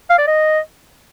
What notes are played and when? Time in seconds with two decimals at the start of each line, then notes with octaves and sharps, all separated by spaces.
0.10 F5
0.19 D5
0.27 D#5